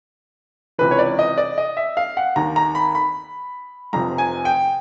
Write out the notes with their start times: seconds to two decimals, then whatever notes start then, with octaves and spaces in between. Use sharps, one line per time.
0.78 C#2 C3 E3 B4
0.91 C#5
0.99 D5
1.19 D#5
1.38 D5
1.58 D#5
1.77 E5
1.97 F5
2.17 F#5
2.36 D#2 D#3 A#5
2.56 A#5
2.75 B5
2.95 B5
3.93 F1 F2 C3 A#5
4.18 G#5
4.45 G5